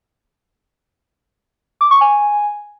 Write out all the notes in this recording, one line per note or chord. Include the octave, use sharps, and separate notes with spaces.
D6
C#6
G#5